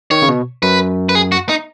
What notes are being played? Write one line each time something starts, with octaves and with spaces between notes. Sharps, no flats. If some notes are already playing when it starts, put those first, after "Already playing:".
D#3 C#5
C#3
B2
F#2 B4
B4
G#4
F#4
D#4